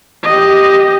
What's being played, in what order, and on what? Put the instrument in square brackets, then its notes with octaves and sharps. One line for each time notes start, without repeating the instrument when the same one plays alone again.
[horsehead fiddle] G4 D#5